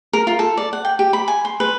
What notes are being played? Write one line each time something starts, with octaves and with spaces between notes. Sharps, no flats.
A#4
F4
A4
D5
F#5
G5
G4
B5
G#5
C6
B4